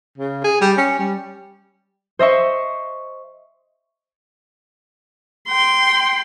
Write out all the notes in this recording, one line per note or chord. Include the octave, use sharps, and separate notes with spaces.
C#3
G#4
G3
C#4
G3
C5 D#5 E5 C#6
G5 C6